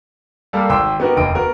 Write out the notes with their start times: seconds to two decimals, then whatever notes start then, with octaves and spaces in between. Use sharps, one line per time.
0.53 G3 A#3 G4 A4 D5 F5
0.69 G#1 G5 C6 E6
1.00 B3 D#4 F#4 G4 A#4
1.17 F1 D#2 D#5 G5 D7
1.35 B3 F#4 A#4